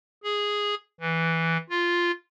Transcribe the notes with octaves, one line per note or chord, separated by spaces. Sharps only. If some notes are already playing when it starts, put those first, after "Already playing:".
G#4
E3
F4